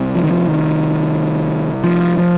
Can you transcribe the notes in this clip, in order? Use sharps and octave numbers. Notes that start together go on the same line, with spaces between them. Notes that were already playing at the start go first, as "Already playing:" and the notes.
Already playing: C2 C3
F3
D#3
F3
D#3
F3
F3